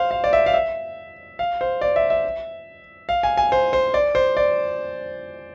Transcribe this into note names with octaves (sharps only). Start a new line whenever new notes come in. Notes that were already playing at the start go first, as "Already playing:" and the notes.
Already playing: C5 F5
F5
D5
E5
F5
E5
F5
C5
D5
E5
E5
F5
G#5
G#5
C5
C5
D5
C5
D5